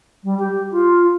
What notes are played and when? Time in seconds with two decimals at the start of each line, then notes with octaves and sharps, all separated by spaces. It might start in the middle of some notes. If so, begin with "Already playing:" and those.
0.24 G3
0.39 G4
0.71 F4